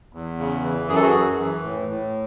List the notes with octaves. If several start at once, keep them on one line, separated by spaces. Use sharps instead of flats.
E2
C#3
E3
F#2 G#4
A4
F#4 G#4
F#2
E3
A2
A2